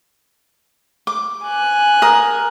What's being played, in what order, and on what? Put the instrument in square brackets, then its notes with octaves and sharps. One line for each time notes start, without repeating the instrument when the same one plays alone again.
[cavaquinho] D6
[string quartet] G#5 F#6
[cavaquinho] A#4 D#6